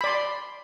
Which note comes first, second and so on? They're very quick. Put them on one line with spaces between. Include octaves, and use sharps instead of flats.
B5 D5 C6